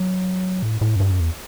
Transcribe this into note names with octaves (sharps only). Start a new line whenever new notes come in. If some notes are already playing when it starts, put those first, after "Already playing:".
Already playing: F#3
A2
A2
F#2
G2
F#2
E2